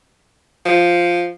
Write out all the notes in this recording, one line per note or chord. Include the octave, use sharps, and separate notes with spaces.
F3